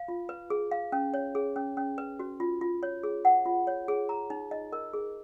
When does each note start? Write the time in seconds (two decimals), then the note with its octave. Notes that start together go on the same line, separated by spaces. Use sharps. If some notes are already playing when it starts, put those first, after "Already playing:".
Already playing: F5
0.08 F4
0.29 B4
0.50 G#4
0.71 F5
0.92 C#4
1.14 C#5
1.35 G#4
1.56 C#4
1.77 C#4
1.98 B4
2.19 F#4
2.40 F4
2.61 F4
2.83 C#5
3.03 G#4
3.25 F#5
3.46 F4
3.67 C#5
3.88 G#4
4.09 A#5
4.30 D#4
4.51 D#5
4.72 A#4
4.93 G#4